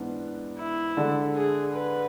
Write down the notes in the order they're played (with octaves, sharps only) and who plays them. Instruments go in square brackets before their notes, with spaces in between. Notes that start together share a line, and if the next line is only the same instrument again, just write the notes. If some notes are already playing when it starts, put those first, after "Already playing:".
Already playing: [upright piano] G#2 E3 B3 D4
[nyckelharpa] E4
[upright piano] D3 G#3 D4 A4
[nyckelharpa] G#4
B4